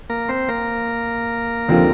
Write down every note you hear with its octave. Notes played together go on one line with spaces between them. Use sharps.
A#3 A#4
C4 C5
A#3 A#4
D#2 D3 F3 C4 F4